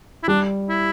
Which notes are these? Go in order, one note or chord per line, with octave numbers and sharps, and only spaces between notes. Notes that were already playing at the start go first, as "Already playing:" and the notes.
E4
G3 D4
E4